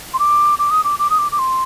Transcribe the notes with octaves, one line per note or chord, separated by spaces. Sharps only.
C6
D6
D6
D#6
D6
D6
D#6
D6
D6
C6